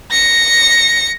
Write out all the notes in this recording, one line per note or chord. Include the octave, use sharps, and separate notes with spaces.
A#6 C#7